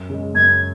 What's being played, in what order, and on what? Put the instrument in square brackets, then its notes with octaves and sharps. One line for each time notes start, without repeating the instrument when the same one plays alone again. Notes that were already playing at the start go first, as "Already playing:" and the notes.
Already playing: [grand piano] F#2
C#3 G#3
[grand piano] F#2 [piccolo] G#6